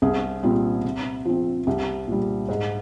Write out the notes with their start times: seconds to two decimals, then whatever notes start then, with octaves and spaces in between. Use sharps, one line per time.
0.02 C2 G#4
0.43 A#2 G3 C4
0.84 C3
1.25 F3 C4
1.67 C2 G4
2.08 A#2 G3
2.49 G#2